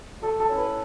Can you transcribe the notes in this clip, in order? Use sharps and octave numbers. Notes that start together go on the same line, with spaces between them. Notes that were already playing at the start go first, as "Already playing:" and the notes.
A3 A4
A4
C#4 E4
B4